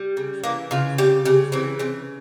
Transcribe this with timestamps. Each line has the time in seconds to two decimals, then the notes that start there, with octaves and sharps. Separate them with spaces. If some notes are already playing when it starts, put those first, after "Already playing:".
Already playing: G3
0.17 C#3
0.43 E3 A#3
0.71 C#3 F4
0.98 G3 G4
1.25 C#3 G4
1.52 E3 C4
1.79 C#3 C4